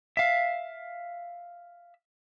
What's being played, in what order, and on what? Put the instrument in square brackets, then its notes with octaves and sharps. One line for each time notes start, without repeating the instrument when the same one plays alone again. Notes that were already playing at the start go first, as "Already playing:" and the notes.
[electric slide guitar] E5 F5